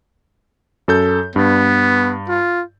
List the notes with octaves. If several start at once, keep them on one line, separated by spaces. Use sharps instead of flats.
F#2 A4 G6
G2 B3
F4